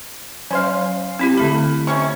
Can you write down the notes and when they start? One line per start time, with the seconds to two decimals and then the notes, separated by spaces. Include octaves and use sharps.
0.51 F#3 C#4 C5 F5
1.19 C4 E4 G4
1.38 D3 A3 B5
1.87 C3 C#4 C#6